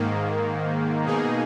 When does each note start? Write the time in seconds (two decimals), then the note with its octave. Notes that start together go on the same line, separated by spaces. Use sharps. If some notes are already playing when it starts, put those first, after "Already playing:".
Already playing: G#2 D#3 A#3
1.05 B2 A#3 D#4 G#4